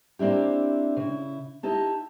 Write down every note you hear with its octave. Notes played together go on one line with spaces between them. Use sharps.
A#3 C4 D4 E4 G4
C#3 E4
D#4 E4 G4 A5